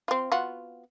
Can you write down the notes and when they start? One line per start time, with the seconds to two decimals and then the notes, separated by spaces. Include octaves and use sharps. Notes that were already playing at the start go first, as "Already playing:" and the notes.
0.08 C4 F4
0.32 B3 F4 F#4